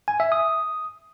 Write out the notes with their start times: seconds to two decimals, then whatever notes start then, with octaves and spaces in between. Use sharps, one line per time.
0.08 G#5
0.20 E5
0.32 D#6